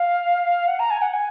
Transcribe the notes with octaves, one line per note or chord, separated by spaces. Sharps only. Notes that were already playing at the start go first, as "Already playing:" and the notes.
Already playing: F5
F#5
A#5
G#5
F#5
G#5